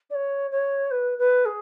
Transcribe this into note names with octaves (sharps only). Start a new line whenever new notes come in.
D5
C#5
C#5
B4
B4
G#4